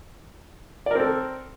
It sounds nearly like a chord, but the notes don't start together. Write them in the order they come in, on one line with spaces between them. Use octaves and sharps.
D5 A#4 C4 A4